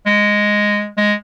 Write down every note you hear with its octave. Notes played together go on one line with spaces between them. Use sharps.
G#3
G#3